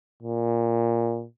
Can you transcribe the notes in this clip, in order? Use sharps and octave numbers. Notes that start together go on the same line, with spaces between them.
A#2